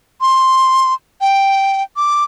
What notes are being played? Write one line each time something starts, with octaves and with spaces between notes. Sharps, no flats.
C6
G5
D6